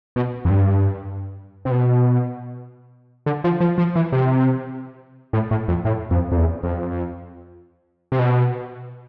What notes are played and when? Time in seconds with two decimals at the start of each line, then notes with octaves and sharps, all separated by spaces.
0.16 B2
0.45 F2
0.50 G2
1.65 C3
1.71 B2
3.26 D3
3.44 F3
3.60 F3
3.78 F3
3.95 E3
4.12 C3
5.33 A2
5.51 A2
5.68 F2
5.85 A2
6.11 F2
6.32 F2
6.37 E2
6.63 F2
8.12 C3
8.19 B2